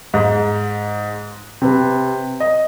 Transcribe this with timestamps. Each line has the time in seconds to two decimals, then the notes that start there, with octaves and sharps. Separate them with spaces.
0.14 G#2
1.62 C3 B4
2.40 D#5